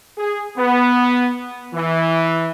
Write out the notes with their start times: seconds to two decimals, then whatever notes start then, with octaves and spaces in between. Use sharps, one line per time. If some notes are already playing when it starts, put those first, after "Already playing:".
0.18 G#4
0.57 B3
1.74 E3